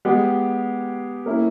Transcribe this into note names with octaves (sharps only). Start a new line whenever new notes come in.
G#3 B3 G4
A#3 C#4 E4